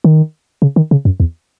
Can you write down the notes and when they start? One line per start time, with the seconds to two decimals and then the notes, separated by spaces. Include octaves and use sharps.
0.04 D#3
0.62 C#3
0.76 D#3
0.91 C#3
1.05 F#2
1.20 E2